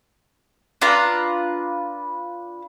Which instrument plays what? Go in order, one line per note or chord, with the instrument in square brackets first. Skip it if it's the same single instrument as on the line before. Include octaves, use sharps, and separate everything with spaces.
[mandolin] D4 F4 B4 A#5